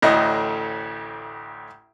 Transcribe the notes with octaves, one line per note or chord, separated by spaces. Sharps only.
A1 D2 A2 D#5